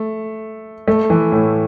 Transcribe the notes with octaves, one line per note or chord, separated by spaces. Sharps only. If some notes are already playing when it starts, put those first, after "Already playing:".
Already playing: A3
A3
E3
A2